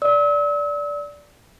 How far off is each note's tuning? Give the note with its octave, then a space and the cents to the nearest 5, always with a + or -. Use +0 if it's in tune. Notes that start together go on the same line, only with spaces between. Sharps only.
D5 -10 E6 -40